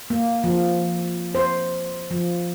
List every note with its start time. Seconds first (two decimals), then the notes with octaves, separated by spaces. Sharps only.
0.10 A#3
0.44 F3
1.35 C5
2.11 F3